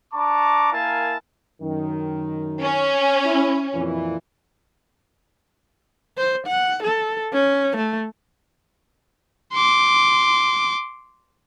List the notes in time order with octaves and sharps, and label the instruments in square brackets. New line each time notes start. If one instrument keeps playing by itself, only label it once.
[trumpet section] D4 A5 A#5 C#6 D6
A#3 E4 A#4 F5 G#5 A5
[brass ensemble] F#2 D#3
[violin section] C#4
[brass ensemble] E4
F2 A#2 E3
[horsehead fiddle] C5
F#5
A4
C#4
A3
[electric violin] C6 D6